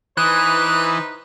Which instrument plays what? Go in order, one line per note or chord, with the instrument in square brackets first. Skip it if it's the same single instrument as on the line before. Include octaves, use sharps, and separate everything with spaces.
[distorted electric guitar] E3 [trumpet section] D#4 B4 C5 [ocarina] D#6 [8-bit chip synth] F#6